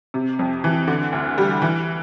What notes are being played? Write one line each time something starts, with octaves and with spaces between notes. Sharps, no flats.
C3
F2
E3
D3
D2
G3
E3